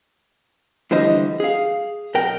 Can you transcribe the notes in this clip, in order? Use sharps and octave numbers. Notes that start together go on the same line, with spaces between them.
D3 E3 G3 C5 D#5
G#4 F5
B1 A#4 G5